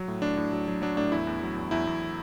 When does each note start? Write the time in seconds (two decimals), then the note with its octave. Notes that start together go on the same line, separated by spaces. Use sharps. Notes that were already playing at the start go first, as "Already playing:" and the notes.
Already playing: F#3
0.08 A2
0.22 A2 D4
0.37 A2
0.52 F#3
0.68 F#3
0.82 F#3 D4
0.97 A2 D4
1.12 E2 E4
1.27 E2
1.42 F#3
1.56 E2
1.71 E2 E4
1.87 E2